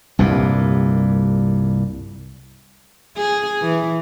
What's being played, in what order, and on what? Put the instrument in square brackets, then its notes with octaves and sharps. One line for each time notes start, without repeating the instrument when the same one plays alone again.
[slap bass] C2 G2 A#2
[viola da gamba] G#4
E3